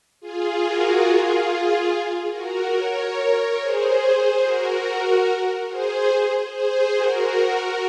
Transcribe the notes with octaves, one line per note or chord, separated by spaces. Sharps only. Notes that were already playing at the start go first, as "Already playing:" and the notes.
F4 G#4
F#4 A#4
F4 G#4
F#4 A#4
A#4 C#5
G#4 C5
F#4 A#4
G#4 C5
G#4 C5
F#4 A#4